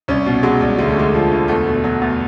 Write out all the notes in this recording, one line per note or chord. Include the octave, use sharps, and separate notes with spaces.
C2 C#4
B2
F#3 G#3
C2
D2 G#3
A3
D3 G#3
F3
D2
E2 A3
B2
F#3
E2